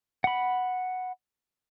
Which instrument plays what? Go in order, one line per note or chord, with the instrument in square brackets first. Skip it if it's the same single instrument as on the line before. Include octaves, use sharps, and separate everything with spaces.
[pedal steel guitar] F#5 B5